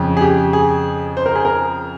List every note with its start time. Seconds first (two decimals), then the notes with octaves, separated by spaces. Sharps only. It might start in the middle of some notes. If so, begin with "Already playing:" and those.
Already playing: F2 C#3
0.17 G#4
0.21 G4
0.53 G#4
1.17 C5
1.26 A#4
1.35 G#4
1.45 A#4